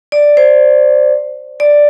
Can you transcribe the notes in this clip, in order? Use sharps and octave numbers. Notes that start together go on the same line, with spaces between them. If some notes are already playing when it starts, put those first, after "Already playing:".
D5
C5
D5